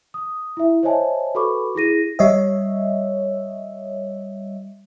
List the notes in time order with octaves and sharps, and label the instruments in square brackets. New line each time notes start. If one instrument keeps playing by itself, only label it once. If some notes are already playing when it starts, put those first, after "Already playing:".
[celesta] D#6
E4 E5
C5 C#5 D#5 E5 G#5 A5
F#4 A4 B4 B5 C#6 D6
E4 G#4 A#6 D#7
[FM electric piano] G3 C#5 D#5 E5